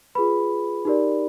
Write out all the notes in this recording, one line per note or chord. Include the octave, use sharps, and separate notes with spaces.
F4 G#4 B4 B5
D#4 G4 A#4 D5